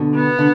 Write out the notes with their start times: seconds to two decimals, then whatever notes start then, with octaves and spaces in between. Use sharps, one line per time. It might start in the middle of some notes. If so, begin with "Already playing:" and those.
Already playing: B2 D3
0.15 B3
0.39 D3